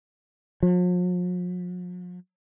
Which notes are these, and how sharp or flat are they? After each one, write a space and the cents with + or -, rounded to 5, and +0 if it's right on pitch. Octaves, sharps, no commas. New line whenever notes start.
F3 +45